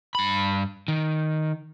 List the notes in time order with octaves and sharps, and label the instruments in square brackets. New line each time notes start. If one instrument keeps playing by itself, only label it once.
[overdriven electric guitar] G2 B5
D#3